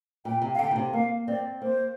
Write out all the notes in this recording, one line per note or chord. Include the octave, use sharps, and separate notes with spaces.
A#2 G5
C3
F5
D3 G5
A#2
C3
A#3 F5
C4 D5
A#3 C5